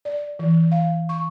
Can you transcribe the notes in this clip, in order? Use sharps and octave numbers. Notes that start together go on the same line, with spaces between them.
D5
E3
F5
C#6